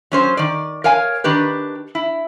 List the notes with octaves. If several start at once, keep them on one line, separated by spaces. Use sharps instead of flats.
F#3 C#4 C5
D#3 D5
A#4 C#5 F5 G#5
D#3 D4 G4 B4
E4